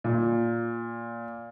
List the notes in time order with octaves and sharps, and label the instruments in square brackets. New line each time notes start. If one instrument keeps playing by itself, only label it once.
[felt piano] A#2